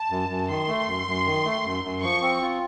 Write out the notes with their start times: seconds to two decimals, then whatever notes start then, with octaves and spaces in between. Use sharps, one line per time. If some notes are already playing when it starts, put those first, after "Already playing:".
Already playing: A5
0.10 F#2
0.29 F#2
0.49 D#3 C6
0.68 A3
0.87 F#2
1.07 F#2
1.26 D#3
1.45 A3
1.65 F#2
1.84 F#2
2.03 F3 C#6
2.22 C4
2.42 F4